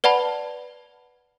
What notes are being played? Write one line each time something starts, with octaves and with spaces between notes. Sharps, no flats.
B4 D5 F#5 A5 B5